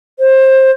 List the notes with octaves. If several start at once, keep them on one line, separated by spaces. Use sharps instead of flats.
C5